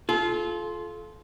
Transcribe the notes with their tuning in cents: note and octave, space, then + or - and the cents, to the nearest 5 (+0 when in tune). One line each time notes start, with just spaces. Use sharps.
F4 +0 A4 -35